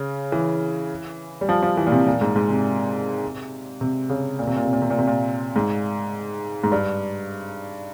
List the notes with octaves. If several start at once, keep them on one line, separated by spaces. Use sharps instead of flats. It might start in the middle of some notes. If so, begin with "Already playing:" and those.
Already playing: C#3
E3
G3
F3
F3
E3
A#2
C3
A#2
G#2
G#2
C3
C3
C#3
A#2
C3
A#2
C3
A#2
C3
A#2
C3
A#2
G#2
G#2
G2